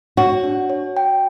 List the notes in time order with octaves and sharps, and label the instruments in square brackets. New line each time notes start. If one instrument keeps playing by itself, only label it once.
[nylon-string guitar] F#4 [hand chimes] C#5
[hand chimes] D4
C#5
G5